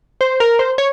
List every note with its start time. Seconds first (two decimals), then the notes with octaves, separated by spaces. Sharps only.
0.21 C5
0.40 A#4
0.59 C5
0.78 C#5